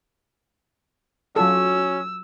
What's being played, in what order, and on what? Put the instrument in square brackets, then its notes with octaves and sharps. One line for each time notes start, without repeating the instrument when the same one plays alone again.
[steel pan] F#3 F4 A4 [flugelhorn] C#4 [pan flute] F#4 [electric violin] E6